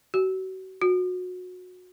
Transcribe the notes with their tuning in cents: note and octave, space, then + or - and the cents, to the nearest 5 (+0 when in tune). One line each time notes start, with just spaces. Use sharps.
F#4 +35
F#4 -25